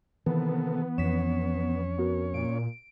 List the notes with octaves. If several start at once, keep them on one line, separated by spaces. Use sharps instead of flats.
C3 D#3 E3 A#3 B3 A4
F2 E3 C#4 C#5 B6 E7
B3 F#4 A#4
A#2 D7